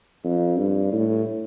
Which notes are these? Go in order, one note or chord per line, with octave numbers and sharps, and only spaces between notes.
F2
G2
A2